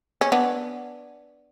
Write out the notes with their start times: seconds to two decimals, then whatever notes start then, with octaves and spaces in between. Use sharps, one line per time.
0.21 C#4
0.32 B3 D4